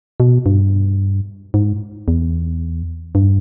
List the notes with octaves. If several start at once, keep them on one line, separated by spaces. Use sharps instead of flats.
B2
G2
G#2
E2
G2